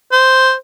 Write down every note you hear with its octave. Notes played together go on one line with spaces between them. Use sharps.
C5